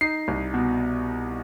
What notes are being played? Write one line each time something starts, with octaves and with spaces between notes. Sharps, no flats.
D#4 C7
C2
B2